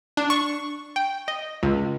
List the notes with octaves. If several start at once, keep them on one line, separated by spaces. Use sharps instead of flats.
D4
C#6
G5
D#5
C#2